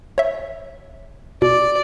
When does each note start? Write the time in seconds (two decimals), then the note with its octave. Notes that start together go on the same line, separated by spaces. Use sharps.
0.18 C#5 E5
1.42 B2 D5